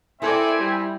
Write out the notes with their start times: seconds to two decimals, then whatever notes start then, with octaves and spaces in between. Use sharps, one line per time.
0.22 C4 E4 A4 D5 E5 G#5
0.58 G3